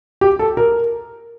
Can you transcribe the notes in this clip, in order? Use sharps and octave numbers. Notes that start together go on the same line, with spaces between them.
G4
A4
A#4